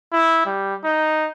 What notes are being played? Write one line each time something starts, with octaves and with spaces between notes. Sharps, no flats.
E4
G3
D#4